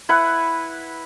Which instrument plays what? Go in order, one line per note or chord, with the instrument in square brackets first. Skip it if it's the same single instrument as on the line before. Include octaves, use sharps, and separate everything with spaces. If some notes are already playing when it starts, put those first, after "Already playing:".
[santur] E4 B4 F#5